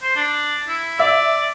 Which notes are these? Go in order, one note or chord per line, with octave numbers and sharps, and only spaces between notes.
C5
D4
E4
D5 E5